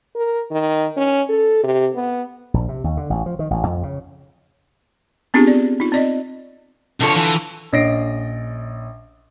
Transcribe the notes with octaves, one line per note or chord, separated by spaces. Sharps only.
A#4
D#3
C#4
A4
C3
B3
A#1
C3
D#2
D3
A1
F3
D#3
A1
F2
C#3
B3 C4 D4 F4 G4 G#4
D5
D#4 F4
C4 D5 D#5
C2 D3 F3 A4 C#5
E3
A#1 C#4 D#5 A#6 C7 D7